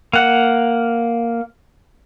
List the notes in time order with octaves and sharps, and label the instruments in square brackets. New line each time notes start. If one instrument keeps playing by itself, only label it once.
[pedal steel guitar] A#3 F#5